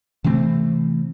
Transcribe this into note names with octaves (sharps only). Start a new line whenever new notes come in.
C3 E3 A3 C4